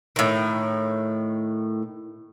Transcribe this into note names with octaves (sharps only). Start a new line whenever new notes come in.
A2 D#3